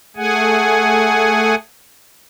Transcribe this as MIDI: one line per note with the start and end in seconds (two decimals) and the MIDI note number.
0.16 1.55 57
0.16 1.55 68
0.16 1.55 78
0.16 1.55 80